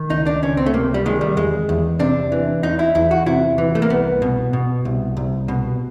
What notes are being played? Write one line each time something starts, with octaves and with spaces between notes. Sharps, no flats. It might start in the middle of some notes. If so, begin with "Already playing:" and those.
Already playing: D#3
C#2 D#4
D4
C#2 C#4
C4
A3
C3 A#3
G3
D#3 G#3
G3
E2 G#3
E2
C3 D4
E3
E2 D#4
E4
E2 E4
F#4
C3 E4
E3
A3
A#3
C2 B3
B2
B2
C2
C2
B2